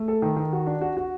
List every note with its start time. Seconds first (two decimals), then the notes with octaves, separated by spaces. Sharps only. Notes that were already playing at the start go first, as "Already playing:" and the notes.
Already playing: A3
0.08 A4
0.22 D#3
0.37 D#3
0.53 F#4
0.67 D4
0.81 F#4
0.97 F#4